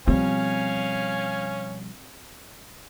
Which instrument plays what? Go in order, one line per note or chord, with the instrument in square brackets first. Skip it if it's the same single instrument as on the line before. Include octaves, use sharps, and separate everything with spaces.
[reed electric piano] B2 F3 G3 [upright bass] C4 [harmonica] C#4 F5 G#5